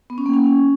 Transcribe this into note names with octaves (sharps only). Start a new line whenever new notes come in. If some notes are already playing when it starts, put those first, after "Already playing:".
B3
C#4
A#3
C#4